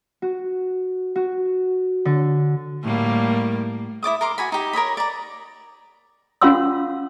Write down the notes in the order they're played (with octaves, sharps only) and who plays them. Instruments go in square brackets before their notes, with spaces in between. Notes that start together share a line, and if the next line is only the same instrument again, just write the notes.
[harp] F#4
F#4
D3
[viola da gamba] A2 G3 A#3
[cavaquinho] E4 D5 D6 D#6
A#4 C6 D6
F#4 G#5 B5
D#4 G4
A#4 C#5 D#5 B5
D5 A#5
[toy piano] C#4 F4 F5 F#5 C6 E6